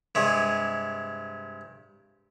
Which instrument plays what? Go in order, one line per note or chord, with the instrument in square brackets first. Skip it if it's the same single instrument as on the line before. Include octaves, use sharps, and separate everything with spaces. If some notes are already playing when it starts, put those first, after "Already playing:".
[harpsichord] G2 C3 G#3